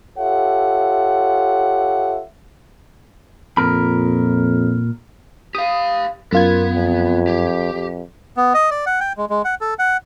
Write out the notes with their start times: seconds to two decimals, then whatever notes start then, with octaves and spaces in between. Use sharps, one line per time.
0.18 F4 G4 A4 C#5 E5 F#5
3.57 F2 A#2 A#4 B5
5.55 G4 F5 D#6
6.33 F#2 B3 F4 A#4 G#6
6.75 F2
7.28 G4
7.73 F2
8.37 B3
8.54 D#5
8.71 D5
8.86 F#5
9.00 G5
9.17 G#3
9.30 G#3
9.45 F#5
9.61 A4
9.79 F#5